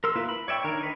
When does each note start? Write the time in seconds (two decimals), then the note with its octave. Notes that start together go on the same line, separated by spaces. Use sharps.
0.04 A#4 C6 E6
0.15 A#3 E4 F4 B4 E5
0.29 B5
0.48 C#5 D5 E5 G5 C#6
0.64 D#3 D4 A#4 C#5
0.81 D#4 B4